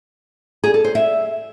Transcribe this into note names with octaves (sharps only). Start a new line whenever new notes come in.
G#4
A4
C5
E5